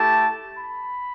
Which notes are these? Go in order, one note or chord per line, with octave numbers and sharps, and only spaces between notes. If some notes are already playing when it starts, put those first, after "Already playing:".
Already playing: A3 E4 G4 A5
B5